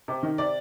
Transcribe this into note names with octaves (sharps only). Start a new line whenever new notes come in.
C3
D#3
C3 D5